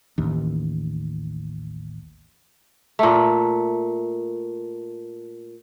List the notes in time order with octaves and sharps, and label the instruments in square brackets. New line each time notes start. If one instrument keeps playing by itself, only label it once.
[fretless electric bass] A1 D#2
[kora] A#2 A3